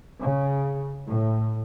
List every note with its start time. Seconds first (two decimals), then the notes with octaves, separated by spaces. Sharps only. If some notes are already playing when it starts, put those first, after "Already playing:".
0.21 C#3
1.08 A2